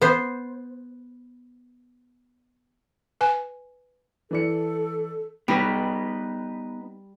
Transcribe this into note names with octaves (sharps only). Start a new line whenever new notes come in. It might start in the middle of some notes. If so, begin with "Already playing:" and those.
B3 C5
B4 G#5
E3 A4 D5 C#7
G3 B3 D#4 B4